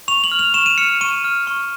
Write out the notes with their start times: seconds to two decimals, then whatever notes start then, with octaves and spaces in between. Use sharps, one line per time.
0.08 C#6 F7
0.24 F#7
0.32 F6
0.39 F7
0.54 C#6 E7
0.66 D#7
0.78 F6 C#7
1.01 C#6 D#7
1.24 F6
1.47 C#6